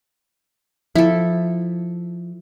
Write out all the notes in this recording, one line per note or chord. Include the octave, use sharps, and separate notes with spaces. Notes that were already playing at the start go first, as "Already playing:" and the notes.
F3 E4 A4